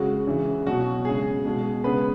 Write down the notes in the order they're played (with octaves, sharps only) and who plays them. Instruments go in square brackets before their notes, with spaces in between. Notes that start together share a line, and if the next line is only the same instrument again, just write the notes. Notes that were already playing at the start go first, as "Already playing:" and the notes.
Already playing: [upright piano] C#3 G#3 F#4
C#3 E3 G#3
B2 F#3 F#4
C#3 G#3 G#4
B2 G#3
C#3 G#3 B3 B4